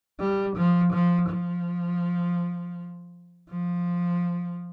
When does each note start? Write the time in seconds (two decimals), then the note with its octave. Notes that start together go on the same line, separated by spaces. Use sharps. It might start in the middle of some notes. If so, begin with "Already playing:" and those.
0.20 G3
0.56 F3
0.93 F3
1.29 F3
3.50 F3